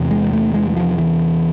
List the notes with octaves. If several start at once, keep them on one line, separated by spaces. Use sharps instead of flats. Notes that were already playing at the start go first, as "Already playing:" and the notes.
Already playing: E2 C3
G#3
A3
G#3
G#3
F3
E3